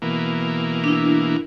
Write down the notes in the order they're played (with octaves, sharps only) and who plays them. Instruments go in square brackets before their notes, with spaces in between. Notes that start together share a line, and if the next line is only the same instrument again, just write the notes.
[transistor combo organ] B2 E3 A#3
[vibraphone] D4 E4